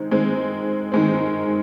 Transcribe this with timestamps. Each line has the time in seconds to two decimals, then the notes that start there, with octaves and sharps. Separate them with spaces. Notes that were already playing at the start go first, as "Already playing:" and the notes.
Already playing: D#3 G#3 C4
0.11 D#3 G#3 C4
0.92 D#3 G#3 C4